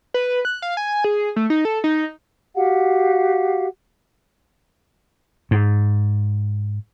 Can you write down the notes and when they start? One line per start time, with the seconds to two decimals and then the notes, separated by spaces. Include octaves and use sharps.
0.14 B4
0.45 F#6
0.62 F5
0.77 G#5
1.04 G#4
1.36 A3
1.50 D#4
1.65 A4
1.84 D#4
2.55 F#4 G4 F5 F#5
5.51 G#2